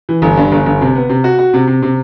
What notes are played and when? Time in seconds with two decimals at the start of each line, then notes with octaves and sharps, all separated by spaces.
0.09 E3
0.22 G1
0.37 G2
0.52 G1
0.66 G1
0.81 C3
0.95 B3
1.10 C3
1.24 F#4
1.39 F#4
1.54 C3
1.67 C3
1.83 C3